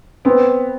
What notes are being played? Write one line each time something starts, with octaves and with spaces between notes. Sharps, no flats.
B3 C4